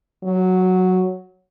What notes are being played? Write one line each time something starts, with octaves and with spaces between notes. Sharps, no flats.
F#3